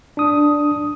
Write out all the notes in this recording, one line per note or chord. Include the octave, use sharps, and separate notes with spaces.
D4 D#6